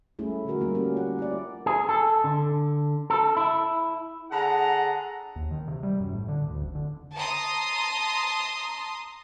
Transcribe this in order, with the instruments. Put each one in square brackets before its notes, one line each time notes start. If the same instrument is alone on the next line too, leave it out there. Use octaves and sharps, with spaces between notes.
[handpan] G3 A3 C#4 E4 G#4
D3 F3 A3 C#4 F#4 A#4
G3 A3 A#3 D#4 F4
C#4 G4 A#4
F4 F#5
E4 D5
[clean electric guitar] G#4
A4
D3
A4
E4
[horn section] D3 G#4 F#5 A#5
[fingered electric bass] D#2
D#3
C3
G3
F#2
A2
D3
D2
F1
D3
[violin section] A5 A#5 C6 D#6